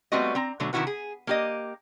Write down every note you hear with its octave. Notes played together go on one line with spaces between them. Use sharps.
G3 A3 B3 C4 F#4 D#5
C4 A#5
B2 D3 F#3 A3
C3 D#3 D#4 E4 F#4 B4
G#4
A#3 G4 D#5